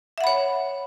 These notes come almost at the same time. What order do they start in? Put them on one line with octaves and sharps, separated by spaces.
E5 F#5 B5 C#5